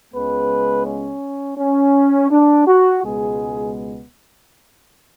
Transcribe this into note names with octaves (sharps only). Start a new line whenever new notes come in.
C#2 C#3 G#3 B3 B4
C#4
C#4
D4
F#4
C#2 B2 G#3 B3 G#4